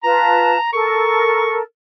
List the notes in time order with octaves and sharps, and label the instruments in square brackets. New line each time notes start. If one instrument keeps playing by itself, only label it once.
[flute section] F4 B4 A5 [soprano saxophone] A#5
[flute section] A4 A#4 [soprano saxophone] C#6